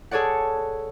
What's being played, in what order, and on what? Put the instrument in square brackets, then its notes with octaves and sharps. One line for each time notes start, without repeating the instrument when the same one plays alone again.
[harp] G#4 A4 C#5 D5 F#5